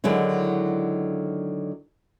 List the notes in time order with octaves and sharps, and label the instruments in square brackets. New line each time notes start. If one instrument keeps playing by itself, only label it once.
[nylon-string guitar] D3 D#3 F#3 G#3 E4